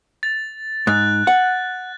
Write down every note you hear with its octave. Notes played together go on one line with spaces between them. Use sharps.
A6
G#2 F#6 A6
F#5